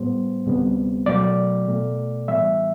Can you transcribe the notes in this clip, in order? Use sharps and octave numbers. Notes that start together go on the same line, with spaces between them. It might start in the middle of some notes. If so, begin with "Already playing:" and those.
Already playing: A2 G3 B3 C5
D2 C3 G3 B3
B2 F#3 A3 D5
B2 A3
A2 E3 G3 B3 E5